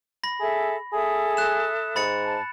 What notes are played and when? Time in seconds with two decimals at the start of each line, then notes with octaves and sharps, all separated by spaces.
0.24 B5 A#6
0.40 G#4 A4 E5
0.93 G#4 A4 E5 D#6
1.37 F#6 E7
1.96 G#2 B5 A6 C#7
2.25 A5